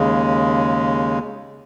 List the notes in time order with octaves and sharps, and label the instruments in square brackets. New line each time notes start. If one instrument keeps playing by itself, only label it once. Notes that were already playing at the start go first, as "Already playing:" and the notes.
Already playing: [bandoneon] D#2 C#3 G#3